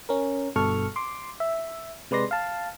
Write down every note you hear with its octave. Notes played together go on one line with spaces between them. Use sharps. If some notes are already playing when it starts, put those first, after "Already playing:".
C#4 A#4
G1 G2 B2 A4 C#6 F6
C6 D6
E5
C3 G#3 B4 D5 C6 A#6
F5 A5